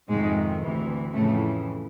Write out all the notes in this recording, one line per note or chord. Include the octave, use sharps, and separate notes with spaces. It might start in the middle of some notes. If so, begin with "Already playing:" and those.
F2 G#2 C3 D#3 G#3
D2 C3 E3
F2 A2 C#3 E3 A3